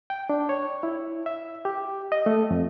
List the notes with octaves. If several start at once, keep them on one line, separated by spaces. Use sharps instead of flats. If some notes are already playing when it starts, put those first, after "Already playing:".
G5
D4
C#5
E4
E5
G4
D#5
A3
F2